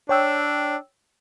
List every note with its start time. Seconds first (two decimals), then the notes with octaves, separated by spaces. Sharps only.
0.09 D4 C#5 G5 E6